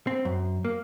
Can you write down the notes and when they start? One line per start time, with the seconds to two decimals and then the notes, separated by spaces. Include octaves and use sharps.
0.07 C4
0.25 F#2
0.65 A#3